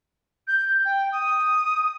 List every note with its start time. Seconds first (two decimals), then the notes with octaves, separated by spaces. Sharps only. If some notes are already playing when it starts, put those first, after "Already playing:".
0.48 G6
0.85 G5
1.12 D#6